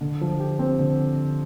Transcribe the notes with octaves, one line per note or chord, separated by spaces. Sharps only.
D3
F3
G4
C4
D3